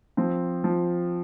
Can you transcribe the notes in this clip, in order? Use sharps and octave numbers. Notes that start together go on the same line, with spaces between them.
F3 C4
F3